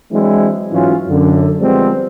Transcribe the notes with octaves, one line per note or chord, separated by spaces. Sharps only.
E3 F#3 G#3 C4 D4 E4
G#2 E3 F#3 C#4 F4
F#2 D3
F3 G3 G#3 B3 C4